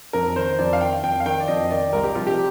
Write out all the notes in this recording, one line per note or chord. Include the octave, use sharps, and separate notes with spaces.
F2 A#4
D#3 C5
F2 D5
F5
D#3 G5
F2 G5
F5
D#3 G5
D5
F2 D#5
D#5
D#3 D5
C2 A#4
G4
C3 F3 F4
G4